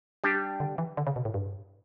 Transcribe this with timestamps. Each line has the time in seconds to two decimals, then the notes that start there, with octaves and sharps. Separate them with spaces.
0.24 G3 D4 G4
0.60 D3
0.78 E3
0.97 D3
1.07 C#3
1.16 B2
1.25 A2
1.34 G2